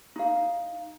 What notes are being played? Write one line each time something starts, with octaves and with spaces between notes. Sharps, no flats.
D#4 F5